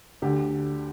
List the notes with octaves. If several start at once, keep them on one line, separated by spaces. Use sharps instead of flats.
D2 D3 G4